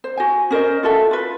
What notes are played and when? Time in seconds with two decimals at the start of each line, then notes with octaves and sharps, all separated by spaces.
0.04 C5
0.17 F#4 G#5
0.51 C#4 A#4 C5 D#5
0.83 F4 F#4 A4 E5
1.11 F4 B4